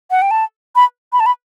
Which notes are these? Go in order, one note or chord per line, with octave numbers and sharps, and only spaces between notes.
F#5
G5
A5
B5
B5
A5
B5